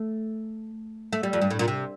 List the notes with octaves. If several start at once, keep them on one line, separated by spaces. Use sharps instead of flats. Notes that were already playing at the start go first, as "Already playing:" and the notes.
Already playing: A3
A3
G3
F2
G2
A2
A#2
C3